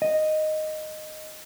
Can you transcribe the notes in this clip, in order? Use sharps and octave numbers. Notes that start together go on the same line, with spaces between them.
D#5